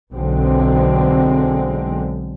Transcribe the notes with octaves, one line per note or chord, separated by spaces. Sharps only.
B1 D3 G#3 C4